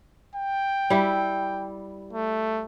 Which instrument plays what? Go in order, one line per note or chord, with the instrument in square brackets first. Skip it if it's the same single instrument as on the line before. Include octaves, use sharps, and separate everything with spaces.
[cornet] G5
[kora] G3 E4
[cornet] A3